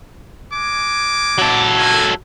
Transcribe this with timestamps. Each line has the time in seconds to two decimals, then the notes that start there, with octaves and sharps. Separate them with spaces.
0.54 G#3 G#5 D6
1.38 F#3 A4
1.79 E4 A#4 G#5